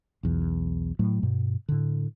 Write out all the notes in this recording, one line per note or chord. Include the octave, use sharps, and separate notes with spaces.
B1 E2
A2 F#3 A3
G2 B2
A2 D3